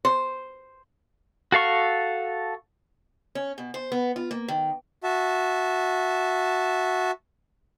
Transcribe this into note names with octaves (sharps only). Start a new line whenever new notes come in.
C5
F#4 A4 F5 C#6
C#4
B2
C5
B3
F4
A#3
D#3
F#4 E5 A5